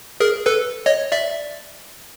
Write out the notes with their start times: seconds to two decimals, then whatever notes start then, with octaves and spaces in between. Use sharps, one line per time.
0.20 G#4 A#4
0.46 A4 B4
0.86 C#5 D#5
1.12 D5 E5